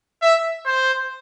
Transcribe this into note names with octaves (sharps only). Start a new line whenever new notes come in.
E5
C5